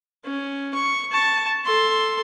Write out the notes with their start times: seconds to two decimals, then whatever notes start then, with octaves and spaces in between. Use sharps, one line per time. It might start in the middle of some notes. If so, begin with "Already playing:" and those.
0.25 C#4
0.74 C#6
1.11 A5 C#6
1.65 A4 C6